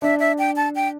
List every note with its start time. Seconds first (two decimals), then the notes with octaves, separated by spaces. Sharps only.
0.02 D4 E5
0.20 E5
0.38 G5
0.56 A5
0.75 G5